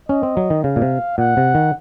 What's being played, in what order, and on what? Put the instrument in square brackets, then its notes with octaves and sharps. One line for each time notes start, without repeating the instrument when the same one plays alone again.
[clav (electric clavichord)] C#4 [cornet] D#5
[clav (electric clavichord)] C4
F#3
D#3
[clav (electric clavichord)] C#3 [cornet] F5
[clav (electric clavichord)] A#2
C3
[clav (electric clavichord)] A#2 [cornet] F#5
[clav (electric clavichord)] C3
D#3